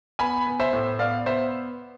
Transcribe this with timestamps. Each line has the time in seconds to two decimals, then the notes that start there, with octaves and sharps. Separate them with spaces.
0.19 B3 G#5 B5
0.46 B3
0.60 C5 E5
0.73 A2
0.99 B3 D5 F5
1.26 B3 C5 E5